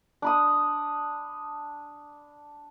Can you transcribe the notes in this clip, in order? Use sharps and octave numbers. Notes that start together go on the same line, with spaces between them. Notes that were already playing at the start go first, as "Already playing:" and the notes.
D4 B5 D#6